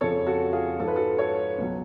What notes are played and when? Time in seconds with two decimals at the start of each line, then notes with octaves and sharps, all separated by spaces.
0.01 F2 C#3 F3 A4 C#5
0.26 F#4 A4
0.53 F4 G#4
0.79 G#2 F3 A4
0.88 B4
0.96 F#4 A4
1.18 A4 C#5
1.58 C#2 B2 F#3